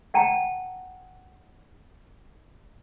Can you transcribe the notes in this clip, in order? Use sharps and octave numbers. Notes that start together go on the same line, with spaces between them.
F#5 G5 A5 A#5